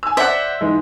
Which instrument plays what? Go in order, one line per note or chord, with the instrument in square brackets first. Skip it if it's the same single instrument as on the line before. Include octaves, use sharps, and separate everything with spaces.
[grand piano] G#5 E6
[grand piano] C5 D5 F#5 [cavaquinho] E5
[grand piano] G#2 E3 G#3